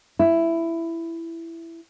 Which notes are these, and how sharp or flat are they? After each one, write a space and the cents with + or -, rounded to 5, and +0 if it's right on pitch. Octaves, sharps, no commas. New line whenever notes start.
E4 +10